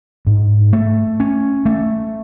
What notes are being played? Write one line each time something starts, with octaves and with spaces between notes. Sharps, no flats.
G#2
A3
C#4
A3